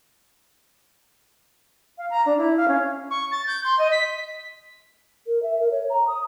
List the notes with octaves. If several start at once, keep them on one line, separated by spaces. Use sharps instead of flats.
F5
A#5
D4
E4
F5
C#4
C#6
A6
G6
C6
D#5
B6
A#4
E5
A#4
C#5
A#5
D#6